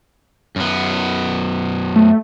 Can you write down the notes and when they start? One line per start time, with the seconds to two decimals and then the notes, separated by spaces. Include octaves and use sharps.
0.56 F#2 B3
1.96 A3